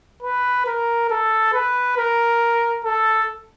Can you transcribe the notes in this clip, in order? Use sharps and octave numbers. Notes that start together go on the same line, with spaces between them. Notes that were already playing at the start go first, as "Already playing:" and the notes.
B4
A#4
A4
B4
A#4
A4